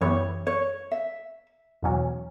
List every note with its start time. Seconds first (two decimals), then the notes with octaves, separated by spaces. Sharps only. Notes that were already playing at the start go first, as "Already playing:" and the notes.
0.01 F#2 E3 B3 E4 G4 C#5
0.47 C#5
0.91 E5
1.82 E2 B2 F#3 C#4